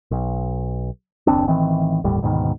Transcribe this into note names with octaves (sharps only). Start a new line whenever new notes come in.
B1
F#1 D#2 C4 D4
A1 D#3 E3 C4
G1 D#2 A2 G3
D2 G#2 B2 D#3